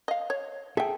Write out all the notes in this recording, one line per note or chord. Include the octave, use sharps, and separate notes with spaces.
D#5 F5
C#5
G#4 A4 E5 G5